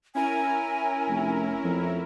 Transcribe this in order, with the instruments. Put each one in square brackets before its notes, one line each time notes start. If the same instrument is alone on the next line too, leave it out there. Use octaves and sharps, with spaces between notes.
[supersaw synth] C#4 E4 A#4 [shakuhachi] G#5
[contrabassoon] F1
F2